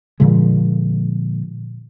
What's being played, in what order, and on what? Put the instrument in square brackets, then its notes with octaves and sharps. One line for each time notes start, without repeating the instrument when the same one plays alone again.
[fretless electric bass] A#2 D3 F3 G#3